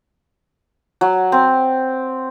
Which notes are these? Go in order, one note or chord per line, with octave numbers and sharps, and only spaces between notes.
F#3
C4